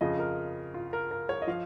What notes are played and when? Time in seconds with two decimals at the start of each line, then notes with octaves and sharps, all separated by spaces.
0.01 F2 C#3 F3 D#5
0.19 A#4
0.74 F4
0.93 A#4
1.11 A#4
1.29 C#5
1.42 D#5
1.47 F3 F5